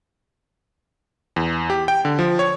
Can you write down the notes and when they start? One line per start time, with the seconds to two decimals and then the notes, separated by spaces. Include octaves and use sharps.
1.36 E2
1.70 G4
1.88 G5
2.05 D3
2.19 F3
2.39 C#5